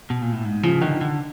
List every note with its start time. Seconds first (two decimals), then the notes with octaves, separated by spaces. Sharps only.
0.10 B2
0.22 A#2
0.33 A2
0.45 G#2
0.63 C#3 F3
0.81 D3 D#3
1.01 D3